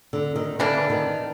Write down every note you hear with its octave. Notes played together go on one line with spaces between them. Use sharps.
D3
D#3
D3 E3 G3 A#3 D4
D#3